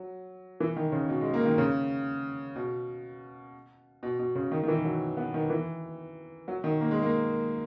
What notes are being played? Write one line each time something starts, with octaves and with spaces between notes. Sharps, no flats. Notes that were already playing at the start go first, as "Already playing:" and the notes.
Already playing: F#3
E3
D#3
C#3
B2
G#3
A#3
D#3
C#3
B2
B2
B2
C#3
D#3
D#3
E3
F#3
B3
D#3
E3
F#3
D#3
A#3
G#3
A#3